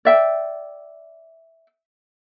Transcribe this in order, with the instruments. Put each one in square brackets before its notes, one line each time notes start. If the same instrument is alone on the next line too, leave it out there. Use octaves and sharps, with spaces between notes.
[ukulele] D5 E5 G5